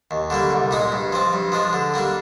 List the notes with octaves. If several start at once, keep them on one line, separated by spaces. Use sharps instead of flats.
D#2
D3 G3 A#3
C2
A#2 G#3 D#4
G2
F3 C4
G2
F3 G#3 D4
D3
G3 A#3 D4